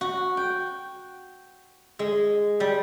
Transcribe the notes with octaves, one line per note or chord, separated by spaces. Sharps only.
F#4
G5
G#3
G3